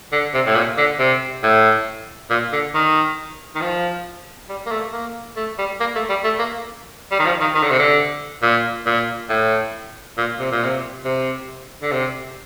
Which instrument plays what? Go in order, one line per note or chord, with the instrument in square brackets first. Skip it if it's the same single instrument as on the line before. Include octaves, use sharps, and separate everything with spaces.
[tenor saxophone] D3
C3
A2
A#2
D3
C3
A2
A#2
D3
D#3
D#3
F3
G3
A#3
A3
A#3
A3
G3
A#3
A3
G3
A3
A#3
G3
D#3
F3
D#3
D#3
D3
C3
D3
A#2
A#2
A2
A#2
C3
A#2
C3
C3
D3
C3